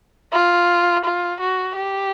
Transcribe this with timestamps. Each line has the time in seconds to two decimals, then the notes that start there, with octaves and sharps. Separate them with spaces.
0.32 F4
1.04 F4
1.40 F#4
1.76 G4